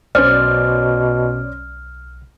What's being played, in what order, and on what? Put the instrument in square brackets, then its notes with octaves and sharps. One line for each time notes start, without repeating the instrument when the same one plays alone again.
[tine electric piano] B1 [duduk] B2 [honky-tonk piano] C#4 C5 D5 [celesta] F6